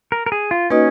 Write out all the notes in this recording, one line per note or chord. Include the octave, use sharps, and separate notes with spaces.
A#4
A#4
G#4
F4
A#3 C#4 D#4 F#4 B4 D#5